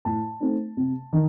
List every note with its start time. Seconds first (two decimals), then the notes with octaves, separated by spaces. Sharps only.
0.05 A2 A5
0.40 A3 C4 D#4
0.77 C3
1.13 D#3